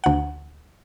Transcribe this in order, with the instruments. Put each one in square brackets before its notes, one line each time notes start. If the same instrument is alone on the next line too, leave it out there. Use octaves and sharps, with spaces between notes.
[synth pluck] D2 F#5